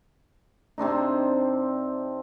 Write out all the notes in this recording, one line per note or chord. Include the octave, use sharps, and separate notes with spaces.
C3 C4 D4 D#4